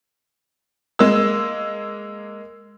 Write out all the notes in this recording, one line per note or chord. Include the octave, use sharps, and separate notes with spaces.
G#3 A#3 E6